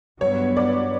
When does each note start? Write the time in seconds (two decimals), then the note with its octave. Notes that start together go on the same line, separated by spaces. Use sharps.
0.21 G2 F#3 B3 C#5
0.57 D5